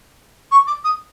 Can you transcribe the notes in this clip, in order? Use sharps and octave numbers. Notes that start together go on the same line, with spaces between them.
C#6
D6
D#6